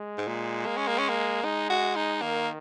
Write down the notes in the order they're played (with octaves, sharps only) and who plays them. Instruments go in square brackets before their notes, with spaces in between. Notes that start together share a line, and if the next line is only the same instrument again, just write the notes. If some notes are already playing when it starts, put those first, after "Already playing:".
Already playing: [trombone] G#3
[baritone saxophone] G#2
A#2
A#3
C#4
A#3
C#4
A#3
[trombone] G#3 [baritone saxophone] D#4
[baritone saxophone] F#4
D#4
[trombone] D#3 [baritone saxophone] A#3